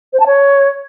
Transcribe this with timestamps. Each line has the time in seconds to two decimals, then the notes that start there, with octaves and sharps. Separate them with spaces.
0.13 C5
0.20 A5
0.26 C#5